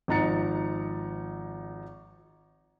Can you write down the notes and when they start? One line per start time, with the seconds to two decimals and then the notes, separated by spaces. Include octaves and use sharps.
0.08 G#1 F3 D#4 A#5 A6 C#7